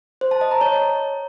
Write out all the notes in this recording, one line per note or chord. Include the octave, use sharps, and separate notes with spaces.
C5
A5
D#5
A#5
C#5